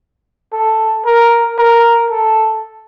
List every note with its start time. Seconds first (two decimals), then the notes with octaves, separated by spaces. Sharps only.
0.53 A4
1.06 A#4
1.58 A#4
2.10 A4